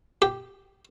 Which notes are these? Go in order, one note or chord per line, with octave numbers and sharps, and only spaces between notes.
G4